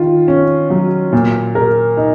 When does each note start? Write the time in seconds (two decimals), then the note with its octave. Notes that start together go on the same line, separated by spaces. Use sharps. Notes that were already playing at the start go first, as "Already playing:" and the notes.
Already playing: D#3 F4
0.28 C#4
0.70 F#3
1.12 A#2
1.55 A#4
1.97 D#4